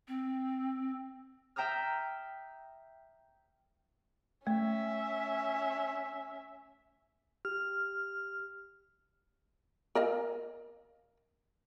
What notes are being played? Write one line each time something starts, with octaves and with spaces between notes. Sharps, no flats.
C4
E5 G5 A#5 D#6 F6
A3 C#4 E5
G4 F6
A#4 D#5 F5